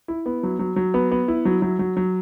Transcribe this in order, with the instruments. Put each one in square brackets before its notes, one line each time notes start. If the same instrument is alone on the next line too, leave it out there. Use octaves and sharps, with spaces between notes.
[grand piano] E4
B3
F#3
F#3
F#3
B3
B3
E4
F#3
F#3
F#3
F#3